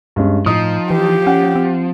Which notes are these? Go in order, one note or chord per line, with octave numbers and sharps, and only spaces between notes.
G2 G#3 C#4
A2 F3 D#4 D#6
E3 G4
C#4 F#5
C4